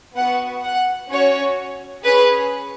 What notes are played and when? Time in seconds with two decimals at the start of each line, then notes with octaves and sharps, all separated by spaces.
0.16 B3 F#4 F#5
0.63 F#5
1.10 C#4 F#4 C#5
2.03 C#4 G#4 B4